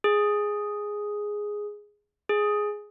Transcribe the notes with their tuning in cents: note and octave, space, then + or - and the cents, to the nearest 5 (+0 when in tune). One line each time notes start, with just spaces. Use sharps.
G#4 +0
G#4 +5